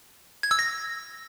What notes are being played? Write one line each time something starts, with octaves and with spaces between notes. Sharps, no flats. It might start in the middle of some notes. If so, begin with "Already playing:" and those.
G#6
E6
A#6